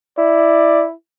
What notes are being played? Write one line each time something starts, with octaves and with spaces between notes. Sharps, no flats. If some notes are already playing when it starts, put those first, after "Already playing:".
E4 D5